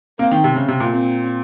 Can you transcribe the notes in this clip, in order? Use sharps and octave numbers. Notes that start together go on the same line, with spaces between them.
A#3 C4
D#3
C3
C#3
C3
A#2
C4